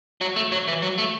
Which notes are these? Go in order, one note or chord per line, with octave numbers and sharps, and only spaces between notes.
F#3
A3
F#3
E3
F#3
A3